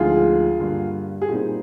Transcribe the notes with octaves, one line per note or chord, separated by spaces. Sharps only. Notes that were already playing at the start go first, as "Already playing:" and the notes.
Already playing: D2 D3 F3 G#3 D#4 F4 G#4
G2 D3 G3 A#3
G#4
A#2 G3 C4 D#4 G4